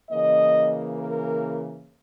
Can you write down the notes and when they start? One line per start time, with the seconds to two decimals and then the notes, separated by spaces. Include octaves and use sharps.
0.10 C#3 E3 A#3 D#5
0.98 A#4